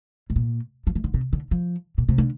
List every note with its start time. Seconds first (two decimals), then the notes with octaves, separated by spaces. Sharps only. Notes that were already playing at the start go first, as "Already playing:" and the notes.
0.30 A2
0.36 A#2
0.87 F3
0.95 E3
1.04 D3
1.14 C3
1.33 D3
1.51 F3
1.98 A#2
2.09 C3
2.18 D3